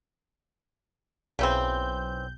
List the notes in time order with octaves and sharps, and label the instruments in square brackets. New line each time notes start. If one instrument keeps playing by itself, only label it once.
[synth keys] B1 G6 [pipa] C#3 E3 C4